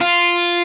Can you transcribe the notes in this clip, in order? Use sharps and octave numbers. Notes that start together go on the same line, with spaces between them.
F4